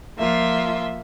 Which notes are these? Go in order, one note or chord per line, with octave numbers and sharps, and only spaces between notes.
F3 A#3 F4 E5